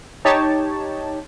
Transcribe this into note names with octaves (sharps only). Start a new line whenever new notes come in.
D#4 G4 C#5 A5